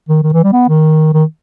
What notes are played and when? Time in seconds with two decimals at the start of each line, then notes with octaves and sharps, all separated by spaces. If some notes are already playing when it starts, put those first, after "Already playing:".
0.08 D#3
0.23 D#3
0.33 E3
0.43 G3
0.53 B3
0.68 D#3
1.13 D#3